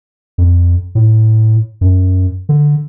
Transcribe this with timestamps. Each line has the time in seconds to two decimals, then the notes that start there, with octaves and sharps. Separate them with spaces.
0.38 F2
0.95 A2
1.81 F#2
2.49 D3